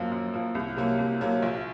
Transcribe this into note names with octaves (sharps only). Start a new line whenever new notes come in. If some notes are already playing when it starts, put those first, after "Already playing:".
Already playing: F#2 F3 A#3
F#2
F3 A#3
C2
C3 F#3 A#3
C2
C3 F#3 A#3
A#1